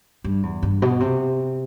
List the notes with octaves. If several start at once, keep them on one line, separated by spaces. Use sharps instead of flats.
G2
E2
G2
B2
C3